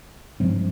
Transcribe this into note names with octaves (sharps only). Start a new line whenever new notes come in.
G2 F3 G#3 C4